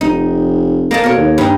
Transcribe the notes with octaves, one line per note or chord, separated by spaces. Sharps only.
F1 D#4
A#3 D#5 A5
B2 A#4 C#5
D#2
G2 D#4